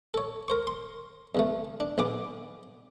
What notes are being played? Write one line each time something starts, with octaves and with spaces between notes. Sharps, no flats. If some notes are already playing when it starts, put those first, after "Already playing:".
A4 C#5
A#4 C5 C#6
C6
E2 C#3 A3
D4
A#1 B3 G#4 D6